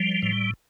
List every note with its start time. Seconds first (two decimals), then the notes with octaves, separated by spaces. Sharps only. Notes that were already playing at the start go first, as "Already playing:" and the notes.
Already playing: F3 G3
0.22 A2